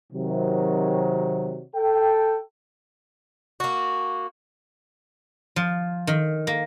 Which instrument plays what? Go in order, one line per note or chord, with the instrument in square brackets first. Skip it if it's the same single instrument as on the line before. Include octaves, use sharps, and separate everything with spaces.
[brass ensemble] C3 D#3 F#3
A4 G5
[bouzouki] A#3 F#4
[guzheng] F3
D#3
A#3